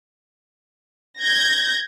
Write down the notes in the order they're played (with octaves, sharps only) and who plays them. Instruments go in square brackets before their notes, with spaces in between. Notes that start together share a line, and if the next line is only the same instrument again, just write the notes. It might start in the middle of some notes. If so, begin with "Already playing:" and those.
[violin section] G6 G#6 A#6